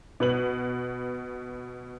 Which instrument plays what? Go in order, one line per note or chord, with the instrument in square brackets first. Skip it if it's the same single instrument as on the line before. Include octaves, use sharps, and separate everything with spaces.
[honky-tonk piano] B2 B4 F#7